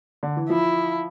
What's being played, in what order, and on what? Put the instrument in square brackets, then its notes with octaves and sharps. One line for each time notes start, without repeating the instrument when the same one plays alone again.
[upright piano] D3
E3
[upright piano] F3 [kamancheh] E4